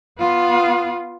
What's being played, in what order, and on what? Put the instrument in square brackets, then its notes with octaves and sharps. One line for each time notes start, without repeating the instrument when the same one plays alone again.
[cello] B3 F4